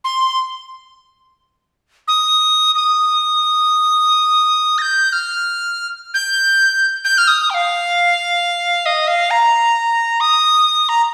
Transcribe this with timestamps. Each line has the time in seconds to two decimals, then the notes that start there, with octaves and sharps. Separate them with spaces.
0.04 C6
2.08 D#6
2.75 D#6
4.78 A#6
4.82 G6
5.13 F6
6.14 G6
7.04 G6
7.18 F6
7.28 D#6
7.50 G5
7.54 F5
8.86 D#5
9.07 F5
9.31 A#5
10.20 D#6
10.89 A#5